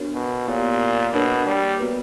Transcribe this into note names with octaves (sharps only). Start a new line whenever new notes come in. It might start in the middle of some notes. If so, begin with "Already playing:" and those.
Already playing: B3 D4 F#4 A#4 C#5
B2
A#2 B3 E4 G4 A#4 C#5
B2 A#3 D4 A#4 C#5
G3
B3 F#4 B4